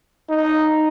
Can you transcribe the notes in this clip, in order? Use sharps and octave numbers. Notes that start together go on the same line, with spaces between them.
D#4